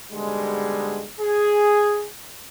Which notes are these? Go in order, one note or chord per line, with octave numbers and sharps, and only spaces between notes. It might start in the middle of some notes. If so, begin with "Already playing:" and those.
G#2 B2 D3 G3 G#3
G#4